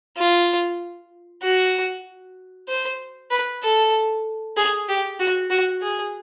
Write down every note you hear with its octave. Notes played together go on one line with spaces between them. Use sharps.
F4
F#4
C5
B4
A4
G#4
G4
F#4
F#4
G#4